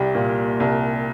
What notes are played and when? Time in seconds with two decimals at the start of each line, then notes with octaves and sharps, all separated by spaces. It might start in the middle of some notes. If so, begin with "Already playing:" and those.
Already playing: C2 G3 G4
0.15 A#2
0.60 C2